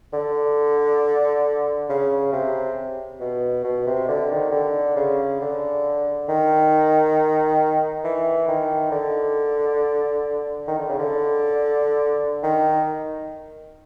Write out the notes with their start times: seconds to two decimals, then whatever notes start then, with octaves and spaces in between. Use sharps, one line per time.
0.13 D3
1.89 C#3
2.33 C3
3.20 B2
3.64 B2
3.86 C3
4.08 D3
4.31 D#3
4.52 D3
4.96 C#3
5.40 D3
6.28 D#3
8.04 E3
8.48 D#3
8.91 D3
10.68 D#3
10.79 D3
10.89 C#3
10.99 D3
12.43 D#3